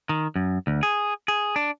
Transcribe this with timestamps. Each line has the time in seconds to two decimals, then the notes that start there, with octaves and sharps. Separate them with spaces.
0.09 D#3
0.36 F#2
0.67 D2
0.83 G#4
1.28 G#4
1.56 D4